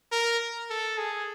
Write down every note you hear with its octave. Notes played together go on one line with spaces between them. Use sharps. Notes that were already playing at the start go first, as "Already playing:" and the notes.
A#4
A4
G#4